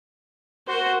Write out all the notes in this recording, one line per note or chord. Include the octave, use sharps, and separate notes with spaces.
F#4 A#4 C5